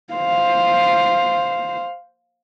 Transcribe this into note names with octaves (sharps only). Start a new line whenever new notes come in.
C5 F5